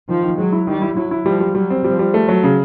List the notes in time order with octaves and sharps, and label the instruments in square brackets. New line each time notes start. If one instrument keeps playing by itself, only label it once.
[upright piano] D#3 [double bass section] F3
[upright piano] D#3
[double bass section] F#3 [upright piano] G#3
[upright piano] E4
[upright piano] D#3 [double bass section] G3
[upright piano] E4
[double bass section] F#3 [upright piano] E4
[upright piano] E4
[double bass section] F3 [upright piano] G3
[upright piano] G3
[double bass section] F#3 [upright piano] G3
[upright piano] C4
[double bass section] F3 [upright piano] G3
[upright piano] G3
A3
F#3
C#3